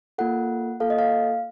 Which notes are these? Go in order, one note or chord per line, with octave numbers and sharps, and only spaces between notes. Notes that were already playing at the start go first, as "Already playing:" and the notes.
A#3 F4 A4 F#5
A#3 F4 A4 F5
D#5
F5